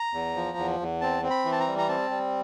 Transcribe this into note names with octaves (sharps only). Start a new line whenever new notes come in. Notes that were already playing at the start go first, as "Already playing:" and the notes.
Already playing: A#5
E2
F3
E2
E2
C4 A5
C4
B5
E3
A5
A#5
G3
A#5
C4 A5
G3